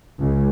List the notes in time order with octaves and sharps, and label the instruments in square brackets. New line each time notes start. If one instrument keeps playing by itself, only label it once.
[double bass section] C#2